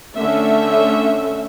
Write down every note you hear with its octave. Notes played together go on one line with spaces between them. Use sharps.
D3 A3 C#4 E5